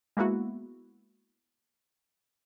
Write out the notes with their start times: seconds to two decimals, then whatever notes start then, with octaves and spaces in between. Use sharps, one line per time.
0.17 G#3 A#3 B3 E4 F#4